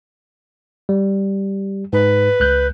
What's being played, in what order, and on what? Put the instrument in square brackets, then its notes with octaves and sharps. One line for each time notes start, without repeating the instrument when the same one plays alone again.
[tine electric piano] G3
[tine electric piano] G#2 [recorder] B4
[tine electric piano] C#2 F#6 G6